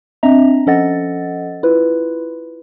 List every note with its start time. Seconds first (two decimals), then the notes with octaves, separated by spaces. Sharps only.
0.23 C4 D4 D#5 E5 A#5
0.67 F3 C#4 A4 D#5 F#5 A6
1.63 E4 F4 B4